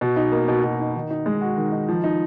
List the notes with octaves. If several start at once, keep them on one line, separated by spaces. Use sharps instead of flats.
B2
D#4
A#3
B2
B2
D#4
D#3
D#4
G#3
F#4
D#3
D#4
F3
D#4